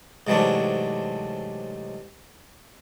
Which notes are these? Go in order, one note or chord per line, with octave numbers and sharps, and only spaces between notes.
G#2 C3 E3 F#3 A3 D4